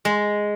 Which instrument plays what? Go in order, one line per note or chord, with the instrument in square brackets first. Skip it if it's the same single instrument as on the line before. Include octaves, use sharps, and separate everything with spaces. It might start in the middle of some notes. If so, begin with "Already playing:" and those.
[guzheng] G#3